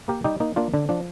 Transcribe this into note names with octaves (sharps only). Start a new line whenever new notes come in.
A#3 G4 A#4
G3 D#4 G4
A#3 D#4
A#3 D4 F4
D3 D4
F3 D4